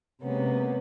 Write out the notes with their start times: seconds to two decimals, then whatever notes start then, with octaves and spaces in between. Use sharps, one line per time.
0.23 C3 G#3 A#3 B3 C#4